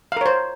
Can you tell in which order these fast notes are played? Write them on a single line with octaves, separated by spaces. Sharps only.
F5 A#4 C#5 C5